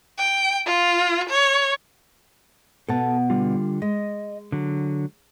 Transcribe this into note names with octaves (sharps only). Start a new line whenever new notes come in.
G5
F4
C#5
B2 B3 A4 A5
D3 G3 F4
G#3 D#5
D3 F#3